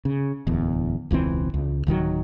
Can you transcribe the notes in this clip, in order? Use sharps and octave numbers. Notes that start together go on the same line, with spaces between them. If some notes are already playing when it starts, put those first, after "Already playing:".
C#3
D1 E2
E1 C#2 E3 C4
C#2
D1 D#3 E3 F#3